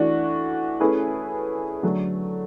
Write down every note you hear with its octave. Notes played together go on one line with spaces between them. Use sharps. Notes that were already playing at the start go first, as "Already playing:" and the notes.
Already playing: E3 A3 D4 F#4
A3 C#4 E4 G#4 B4
D3 F#3 A3